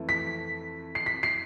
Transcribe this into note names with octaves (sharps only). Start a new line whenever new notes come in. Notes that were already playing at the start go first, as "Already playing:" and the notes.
Already playing: F2 E3 A3 E4 A4
B6
C7
B6
C7